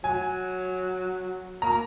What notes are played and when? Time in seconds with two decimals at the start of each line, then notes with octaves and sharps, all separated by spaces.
0.03 F#3 G#5
1.62 A#3 A#5